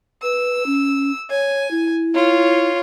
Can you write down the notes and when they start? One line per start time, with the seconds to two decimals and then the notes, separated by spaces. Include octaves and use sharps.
0.23 B4 E6
0.66 C#4
1.30 C#5 G#5
1.71 E4
2.14 F4 C#5